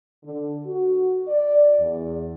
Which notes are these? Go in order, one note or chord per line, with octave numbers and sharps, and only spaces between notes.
D3
F#4
D5
E2